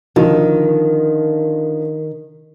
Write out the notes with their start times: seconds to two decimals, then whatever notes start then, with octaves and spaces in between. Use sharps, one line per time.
0.16 D3 D#3 F3